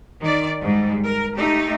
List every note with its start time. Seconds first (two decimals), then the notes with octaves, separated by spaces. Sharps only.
0.20 D#3 D5
0.60 G#2 G3
1.04 A#4
1.37 A3 D#4 G4